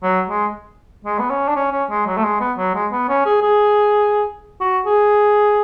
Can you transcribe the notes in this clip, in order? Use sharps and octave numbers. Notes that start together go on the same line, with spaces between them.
F#3
G#3
G#3
B3
C#4
D4
C#4
C#4
G#3
F#3
A3
G#3
B3
F#3
G#3
B3
C#4
G#4
G#4
F#4
G#4